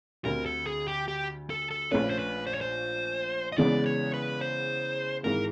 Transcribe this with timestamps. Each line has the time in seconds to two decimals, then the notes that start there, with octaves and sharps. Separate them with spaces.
0.25 D2 D3 G3 C4 A#4
0.46 A4
0.67 G#4
0.88 G4
1.08 G4
1.50 A4
1.71 A4
1.91 A#1 A#2 F3 A3 C#4 B4
2.10 C5
2.19 B4
2.47 C5
2.54 C#5
2.61 C5
3.52 D#5
3.58 E2 C#3 E3 G#3 B3 D5
3.86 C#5
4.14 B4
4.41 C5
5.24 G#1 G#2 E3 G#3 A#4